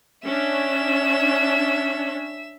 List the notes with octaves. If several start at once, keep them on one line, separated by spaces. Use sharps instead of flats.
C#4 D4 E5 E7